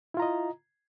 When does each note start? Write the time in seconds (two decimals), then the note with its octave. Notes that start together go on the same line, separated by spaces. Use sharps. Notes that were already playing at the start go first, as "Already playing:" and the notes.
0.14 E4
0.17 F4
0.20 A#5
0.22 D#5